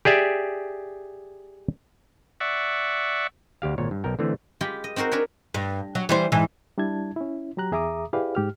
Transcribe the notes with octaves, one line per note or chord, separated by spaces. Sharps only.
G4 G#4 D5 E5
D5 E5 F#5 C#6
D2 G4 F5
G#1 A#2 C#5
G2
B1 A#4 G5
D3 E3 A3 C4
G#3 F4 G4 B5
D#5
C4 D#4 F#4 A#4 C5
D4 G#4 A#4 B4 C#5
G2
F#3
E3 G3 C5
G#2 E3
G3 D4 E4 A5 G#6
C#4 E4
F#3 G4 A#5 F#6
E2 G#4 E5 A#5 D6 D#6
E4 G4 G#4 B4 D5 F5
G#2 G4 F6